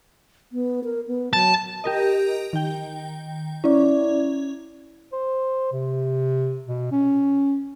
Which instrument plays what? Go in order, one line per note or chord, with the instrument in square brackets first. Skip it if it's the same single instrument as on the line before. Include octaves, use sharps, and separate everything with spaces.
[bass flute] B3
A#4
B3
[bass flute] F#3 [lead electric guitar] A5
[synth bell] G4 A#4 D#5
D#3 G5
[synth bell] C#4 [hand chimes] E4 D5
[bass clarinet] C5
C3
B2
C#4